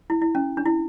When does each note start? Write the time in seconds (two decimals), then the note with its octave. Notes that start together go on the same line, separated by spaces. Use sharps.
0.10 E4
0.22 E4
0.35 C#4
0.57 D4
0.66 E4